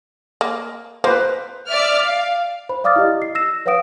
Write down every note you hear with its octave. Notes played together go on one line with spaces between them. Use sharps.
A#3
A#3 B4 C5
D5 E5 F6
F5
C5 B5
D5 F5 D6 D#6 F6 A6
E4 G4 D#5
C7
E6 A#6 E7
B4 C#5 F5 F#5 D#6 D7